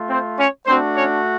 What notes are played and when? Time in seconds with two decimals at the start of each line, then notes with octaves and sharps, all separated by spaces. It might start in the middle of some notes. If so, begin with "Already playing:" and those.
Already playing: A3 F4
0.10 C4 C5
0.39 C#4 C#5
0.67 A3 C4 D4 F#4 C5
0.96 C#4 C#5